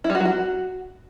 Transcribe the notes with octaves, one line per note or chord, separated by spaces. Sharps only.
E4
G3
F#4
F#3
F#4